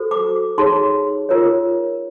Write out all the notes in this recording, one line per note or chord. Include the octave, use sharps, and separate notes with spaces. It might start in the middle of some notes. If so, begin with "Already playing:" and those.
Already playing: F#4 A4 C5
D6
D#4 G#4 C#5 C6
F4 A#4 C#5